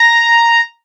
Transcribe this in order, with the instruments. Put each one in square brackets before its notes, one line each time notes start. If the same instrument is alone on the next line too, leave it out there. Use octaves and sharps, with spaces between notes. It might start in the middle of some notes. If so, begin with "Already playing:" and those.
Already playing: [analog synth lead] A#5